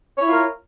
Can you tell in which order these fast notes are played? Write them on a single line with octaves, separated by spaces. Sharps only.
C#5 E4 F4 A#4